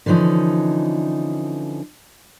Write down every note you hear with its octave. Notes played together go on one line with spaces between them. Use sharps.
D3 E3 F3 C#4 D#4